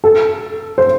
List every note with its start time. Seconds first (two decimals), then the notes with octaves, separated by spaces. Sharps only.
0.04 A4
0.78 C5